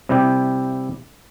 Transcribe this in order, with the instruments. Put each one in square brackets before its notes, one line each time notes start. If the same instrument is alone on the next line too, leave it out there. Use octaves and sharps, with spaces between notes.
[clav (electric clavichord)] C3 G3 E4 G4